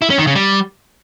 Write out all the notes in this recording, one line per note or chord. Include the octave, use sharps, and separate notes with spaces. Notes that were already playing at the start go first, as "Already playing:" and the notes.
E4
C#4
D#3
C#3
G3